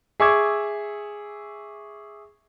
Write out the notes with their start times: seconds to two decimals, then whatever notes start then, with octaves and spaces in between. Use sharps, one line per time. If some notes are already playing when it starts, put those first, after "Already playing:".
0.20 G#4 E5 C#6 D6 E6 G#6